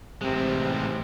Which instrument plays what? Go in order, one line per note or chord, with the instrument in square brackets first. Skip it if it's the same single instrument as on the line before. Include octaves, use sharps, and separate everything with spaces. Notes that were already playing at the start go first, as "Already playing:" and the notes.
[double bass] A1 G#2 [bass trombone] C3 [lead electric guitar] G#3 C4